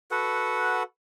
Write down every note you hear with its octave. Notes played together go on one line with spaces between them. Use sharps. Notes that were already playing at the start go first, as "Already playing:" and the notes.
F#4 A4 B4 F#5